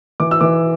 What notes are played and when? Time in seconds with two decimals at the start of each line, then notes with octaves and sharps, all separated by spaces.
0.20 E3 D6
0.31 E6
0.41 E3 D6